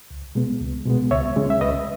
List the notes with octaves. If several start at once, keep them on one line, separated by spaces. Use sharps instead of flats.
C#2
B2 G#3 B3
C#2
B2 G#3 B3
C#2 C#5 E5
C#3 G#3 C#4
E5
C#2 B4 D#5